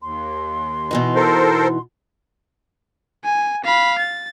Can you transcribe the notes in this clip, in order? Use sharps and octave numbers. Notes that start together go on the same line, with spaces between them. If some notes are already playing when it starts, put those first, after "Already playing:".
D#2 C6
B2 E3 D#4
A4 A#4 C5
G#5
F5 B5
A6